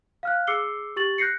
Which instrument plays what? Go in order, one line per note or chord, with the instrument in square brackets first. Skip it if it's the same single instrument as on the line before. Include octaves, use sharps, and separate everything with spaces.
[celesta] F5 F6 F#6
G#4 D6 E6 C7 C#7 G7
G4 C#6 A6 F#7
F#6 G6 A#6 C7 C#7